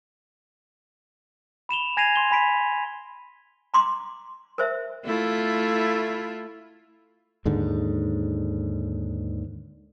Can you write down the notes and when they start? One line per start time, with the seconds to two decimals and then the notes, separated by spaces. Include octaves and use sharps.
1.69 B5 E7 F7 G7
1.97 G#5 G#6 A#6 C7 D#7 F7
2.15 C6 G7
2.31 G#5 B5 B6 D7
3.74 A#5 C6 D6
4.58 A#4 C5 E5
5.05 A3 E4 F4
7.45 D#2 G#2 D3